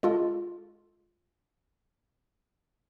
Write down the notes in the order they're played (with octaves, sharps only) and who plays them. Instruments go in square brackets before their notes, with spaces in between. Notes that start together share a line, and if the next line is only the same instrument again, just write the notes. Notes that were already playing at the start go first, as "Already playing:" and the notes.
[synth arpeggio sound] G#3 F4 A4